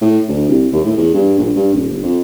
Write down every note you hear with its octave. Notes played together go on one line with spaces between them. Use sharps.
A2
D2
C2
D#2
A2
E2
G2
A#1
G2
D#1
G1
F2